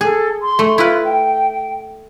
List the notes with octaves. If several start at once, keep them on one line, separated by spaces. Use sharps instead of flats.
G#4 A4
C6
A3
E4 F4 B4
G5